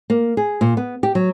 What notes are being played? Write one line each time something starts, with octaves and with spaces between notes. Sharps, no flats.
A#3
G#4
A#2
B3
G4
F#3